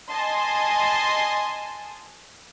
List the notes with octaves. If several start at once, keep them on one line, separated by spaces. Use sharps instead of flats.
D#5 G#5 A5 C6